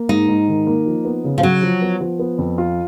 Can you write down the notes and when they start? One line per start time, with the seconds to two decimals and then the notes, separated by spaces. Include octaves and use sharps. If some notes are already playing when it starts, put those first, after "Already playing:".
Already playing: A#3
0.09 G#2 D#4
0.28 G#2
0.48 D#3
0.67 A#3
0.86 F3
1.05 B3
1.24 C#3
1.38 F3
1.43 F#3 F#4
1.62 F3
1.82 B3
2.01 F3
2.19 B3
2.38 F2
2.58 F4